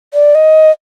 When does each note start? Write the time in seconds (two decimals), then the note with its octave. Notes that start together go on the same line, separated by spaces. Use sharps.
0.14 D5
0.35 D#5